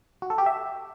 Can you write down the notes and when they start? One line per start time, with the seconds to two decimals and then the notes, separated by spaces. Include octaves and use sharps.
0.22 F#4
0.30 A4
0.38 G4
0.46 E5